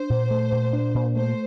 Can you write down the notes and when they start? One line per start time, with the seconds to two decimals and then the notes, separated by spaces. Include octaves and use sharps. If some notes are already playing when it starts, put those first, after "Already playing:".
Already playing: D4 C5
0.10 A#2
0.31 A3
0.52 A#2
0.73 D4
0.94 A#2
1.15 A3 C5